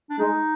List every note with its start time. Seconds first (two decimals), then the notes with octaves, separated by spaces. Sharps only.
0.10 D4
0.18 G#3 D#4